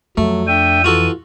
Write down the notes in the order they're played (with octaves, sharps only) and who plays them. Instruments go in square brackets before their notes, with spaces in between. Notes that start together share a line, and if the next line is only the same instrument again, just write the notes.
[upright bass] F2 [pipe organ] F#3 [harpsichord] A3
[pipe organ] D4 E5 G5 [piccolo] D#7
[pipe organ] E3 [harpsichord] F4 F#4 A4